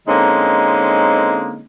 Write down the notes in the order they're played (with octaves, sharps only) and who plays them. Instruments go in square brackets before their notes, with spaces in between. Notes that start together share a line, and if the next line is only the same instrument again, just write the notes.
[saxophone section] D3 G#3 A#3 C4 C#4 D#4